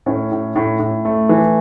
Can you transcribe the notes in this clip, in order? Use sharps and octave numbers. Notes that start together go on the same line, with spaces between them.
A2 C#4
A2
A2
A2
A3
E3